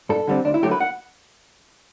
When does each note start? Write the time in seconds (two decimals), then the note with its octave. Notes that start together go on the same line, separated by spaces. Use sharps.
0.09 G2 A4
0.27 D3 G3 C4
0.45 D2 D4
0.54 E4
0.62 D3 F#3 A3 G4
0.71 B4
0.80 F#5